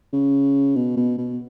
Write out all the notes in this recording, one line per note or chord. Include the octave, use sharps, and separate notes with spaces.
C#3
B2
B2
B2